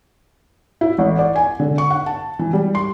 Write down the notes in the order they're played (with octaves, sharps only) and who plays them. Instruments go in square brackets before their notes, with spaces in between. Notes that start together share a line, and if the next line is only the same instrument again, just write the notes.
[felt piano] E4
A1
D5
G#5
D3
C#6
F#5
A5
E3
G3
C6